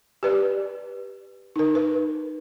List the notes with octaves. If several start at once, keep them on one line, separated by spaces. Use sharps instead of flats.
G4 B4 D5
D#4 A#4
B4